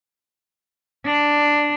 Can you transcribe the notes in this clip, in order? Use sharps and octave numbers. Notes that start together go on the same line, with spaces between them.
D4